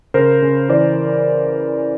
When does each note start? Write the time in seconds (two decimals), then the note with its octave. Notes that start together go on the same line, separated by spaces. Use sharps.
0.14 C#3 A#4 C5
0.42 C#3
0.69 E3 C5 D5